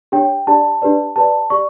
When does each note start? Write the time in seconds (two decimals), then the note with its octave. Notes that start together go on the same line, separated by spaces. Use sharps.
0.12 D4 G4 C#5 G5
0.47 D4 G4 D5 A5
0.82 D4 G4 B4 D5
1.16 G4 B4 D5 A5
1.50 G4 D5 C#6